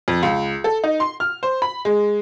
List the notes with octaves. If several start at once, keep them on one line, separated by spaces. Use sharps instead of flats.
F2
C#2
A4
D#4
C6
F6
C5
B5
G#3